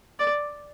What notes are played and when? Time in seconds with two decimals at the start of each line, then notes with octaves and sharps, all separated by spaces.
0.20 D5